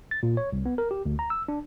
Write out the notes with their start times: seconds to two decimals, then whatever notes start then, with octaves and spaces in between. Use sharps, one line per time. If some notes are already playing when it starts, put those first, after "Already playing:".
0.11 A6
0.23 A#2
0.37 C#5
0.52 C2
0.66 B3
0.78 A#4
0.91 G4
1.05 D2
1.19 A#5
1.30 E6
1.48 D4